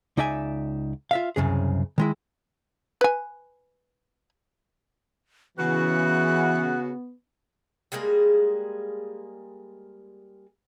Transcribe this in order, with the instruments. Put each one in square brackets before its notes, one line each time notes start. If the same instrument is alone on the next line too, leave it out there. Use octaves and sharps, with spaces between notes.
[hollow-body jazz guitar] C#2 D#4 D5 E5 G#5
F4 E5 F5
C2 F#2 C#3 G#4
D#3 G#3 E4
[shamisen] B4 G#5
[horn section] C#3 F#4 [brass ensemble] E3 [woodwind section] B3 [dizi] F#6
[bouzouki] G3 G#3 A#3 G#4